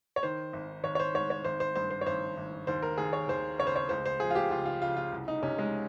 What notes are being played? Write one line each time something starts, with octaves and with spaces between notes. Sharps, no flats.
C#5
D#3 C5
G#1
G#1 C#5
C#5
C5
G#2 C#5
C#5
G#1 C5
C5
G2 C5
C5
C#5
G#1 C5
G#1
D#2 C5
A#4
D#2 G#4
C#5
D#2 C5
C#3 C#5
C5
C#5
C#2 C5
C5
F3 G#4
F4
G4
C#2 F4
F4
C#3 F4
F4
C2
D#4
C3 C#4
G#3